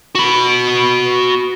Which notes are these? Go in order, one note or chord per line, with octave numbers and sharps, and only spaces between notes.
F#4 B5